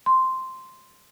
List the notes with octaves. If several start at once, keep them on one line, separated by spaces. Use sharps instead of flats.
C6